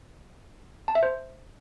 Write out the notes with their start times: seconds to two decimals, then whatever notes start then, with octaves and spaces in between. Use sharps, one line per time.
0.88 A5
0.95 E5
1.03 C5